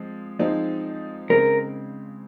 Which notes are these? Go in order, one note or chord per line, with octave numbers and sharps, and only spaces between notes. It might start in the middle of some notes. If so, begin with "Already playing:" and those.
Already playing: F3 G#3 C4
F3 G#3 C4 D#4
C#3 G#3 C4 A#4